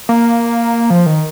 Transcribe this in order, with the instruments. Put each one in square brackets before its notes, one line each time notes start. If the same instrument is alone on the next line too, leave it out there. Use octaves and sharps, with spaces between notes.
[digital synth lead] A#3
F3
D#3